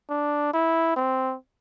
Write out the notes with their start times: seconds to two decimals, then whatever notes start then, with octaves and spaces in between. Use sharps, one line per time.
0.10 D4
0.54 E4
0.96 C4